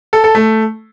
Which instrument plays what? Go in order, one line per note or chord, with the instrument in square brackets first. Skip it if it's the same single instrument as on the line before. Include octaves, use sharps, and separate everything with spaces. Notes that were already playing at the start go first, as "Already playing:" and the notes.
[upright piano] A4
A4
A3